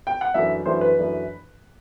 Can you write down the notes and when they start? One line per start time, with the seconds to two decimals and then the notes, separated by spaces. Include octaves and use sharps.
0.07 G5
0.21 F#5
0.34 F#2 E3 A3 D4 E5
0.66 F#2 E3 A3 D4 C5
0.81 B4
0.98 F#2 E3 A3 D4